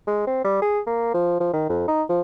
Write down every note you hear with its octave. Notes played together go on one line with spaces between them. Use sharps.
G#3
C4
G3
G#4
A#3
F3
F3
D#3
F2
D#4
F3